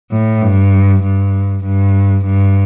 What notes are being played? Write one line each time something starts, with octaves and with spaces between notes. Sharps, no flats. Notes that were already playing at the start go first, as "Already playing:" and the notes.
A2
G2
G2
G2
G2